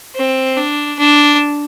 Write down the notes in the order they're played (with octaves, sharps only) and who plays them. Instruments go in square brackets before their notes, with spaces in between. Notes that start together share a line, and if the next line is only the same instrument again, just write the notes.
[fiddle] C4
D4
D4